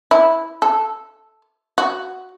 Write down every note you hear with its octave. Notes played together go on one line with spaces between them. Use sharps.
E4
A4
F#4